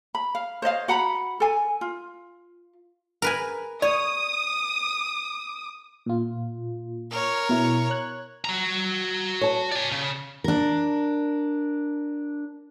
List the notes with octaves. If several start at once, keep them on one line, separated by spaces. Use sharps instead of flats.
B5
F5
C5 C#5 D#5 F5
F#4 F#5 A#5 B5
A4 G#5
F4
A#4 B4 G#5
C#5 D5 D#6
A#2 F4
A#4 C#5
B2 E4
C#5 F#6 G#6
F#4 A#5
C#5 A5
D5 G#5
C#3
D4 A#4